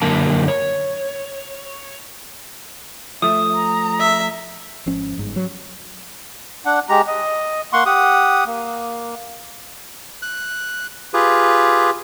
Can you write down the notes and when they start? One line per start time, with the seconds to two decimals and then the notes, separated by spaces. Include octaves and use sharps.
0.02 F#2 D3 A#3 A5
0.48 C#5
3.22 F3 A3 E5 D#6
3.54 A#5
4.00 E5
4.86 G#1 F3 C#4
5.18 G1 G#2
5.36 F#3
6.65 D4 F#5
6.89 G#3 G4 A#5
7.07 D#5
7.73 A#3 F#5 C6 C#6
7.86 G4 F#5 D#6
8.46 A#3
10.22 F#6
11.14 F4 G4 G#4 B4